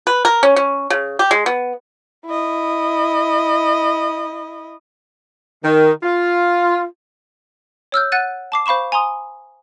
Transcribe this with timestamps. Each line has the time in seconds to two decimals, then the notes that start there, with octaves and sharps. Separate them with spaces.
0.07 B4
0.25 A#4
0.43 C#4
0.56 C#4
0.90 C#3
1.19 G4
1.31 G#3
1.46 B3
2.26 E4 D#5
5.64 D#3
6.03 F4
7.92 C#5 E6 F6 G6
8.12 F#5 F#6 A6 D#7
8.52 A5 D6 C7
8.66 C5 F5 B5 C#6 E7
8.92 G#5 A#5 C6 D#6